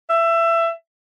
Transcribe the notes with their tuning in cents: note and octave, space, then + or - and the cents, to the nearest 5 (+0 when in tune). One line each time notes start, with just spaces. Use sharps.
E5 +20